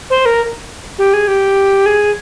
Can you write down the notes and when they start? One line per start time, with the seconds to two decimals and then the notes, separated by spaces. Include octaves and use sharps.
0.10 C5
0.26 A#4
0.98 G4
1.14 G#4
1.28 G4
1.86 G#4